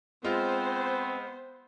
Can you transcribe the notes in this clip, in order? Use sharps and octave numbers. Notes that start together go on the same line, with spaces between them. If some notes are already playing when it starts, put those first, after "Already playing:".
G#3 B3 C4 F4 C5